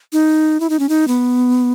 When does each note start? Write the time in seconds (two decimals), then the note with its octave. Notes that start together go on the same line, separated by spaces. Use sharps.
0.13 D#4
0.60 E4
0.70 D#4
0.79 C#4
0.89 D#4
1.08 B3